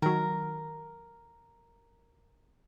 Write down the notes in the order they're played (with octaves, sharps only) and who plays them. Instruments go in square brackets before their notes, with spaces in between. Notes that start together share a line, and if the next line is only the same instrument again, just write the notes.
[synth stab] D#3 F#3 [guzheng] A#4